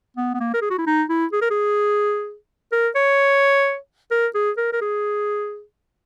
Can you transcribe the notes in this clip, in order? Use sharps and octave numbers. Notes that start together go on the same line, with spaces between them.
B3
B3
A#3
A#4
G#4
F#4
E4
D#4
E4
G#4
A#4
G#4
A#4
C#5
A#4
G#4
A#4
A#4
G#4